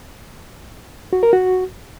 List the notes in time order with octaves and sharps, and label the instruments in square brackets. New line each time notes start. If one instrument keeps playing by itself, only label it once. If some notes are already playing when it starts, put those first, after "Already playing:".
[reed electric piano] F#4
A#4
F#4